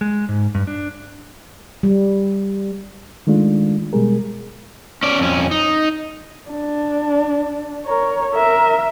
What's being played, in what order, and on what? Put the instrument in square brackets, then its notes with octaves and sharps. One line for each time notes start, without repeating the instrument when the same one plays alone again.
[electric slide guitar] G#3
G#2
G2
D4
[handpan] G3
[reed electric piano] D#3 G#3 A3 D4 F4
B2 G3 G#3 G#4 A#4
[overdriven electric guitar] C#4 D5
F2 C#4
D#4
[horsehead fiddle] D4
A#4 C#5
A#4 E5